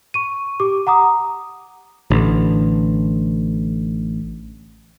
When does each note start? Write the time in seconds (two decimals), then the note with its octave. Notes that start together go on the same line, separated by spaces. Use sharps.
0.14 C#6 D#7
0.60 G4 D6
0.87 F#5 A#5 D6 D#6
2.10 A1 D3